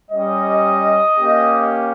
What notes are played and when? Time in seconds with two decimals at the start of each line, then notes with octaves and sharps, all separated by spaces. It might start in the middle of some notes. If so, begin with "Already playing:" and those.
0.11 G3 C#4 G4 D#5
1.17 A#3 C#4 G4